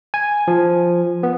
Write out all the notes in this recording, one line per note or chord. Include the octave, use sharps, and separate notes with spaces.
G#5
F3
B3